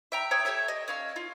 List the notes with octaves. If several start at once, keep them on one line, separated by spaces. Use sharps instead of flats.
E5 G5 A#5
C#5 E5 G5 D#6
G4 A4 C#5 E5
D#5
C#4 F5 E6
F4